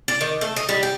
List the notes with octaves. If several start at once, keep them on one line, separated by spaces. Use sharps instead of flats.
D5
D#3
A3
D#4
G3
G4